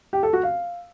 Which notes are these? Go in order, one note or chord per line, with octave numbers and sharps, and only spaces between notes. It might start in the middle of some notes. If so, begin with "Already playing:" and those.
G4
A4
F#4
F5